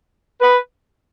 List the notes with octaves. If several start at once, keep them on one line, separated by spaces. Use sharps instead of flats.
B4